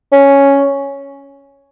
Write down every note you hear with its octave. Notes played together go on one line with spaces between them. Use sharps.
C#4